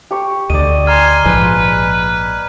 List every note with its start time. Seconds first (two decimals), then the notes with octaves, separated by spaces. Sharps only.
0.11 G4 C#6
0.50 D2 D3 D5 D#5 D#7
0.87 G#5 A#5 C6 F6
1.25 A#1 G#2 F3 B4 G#5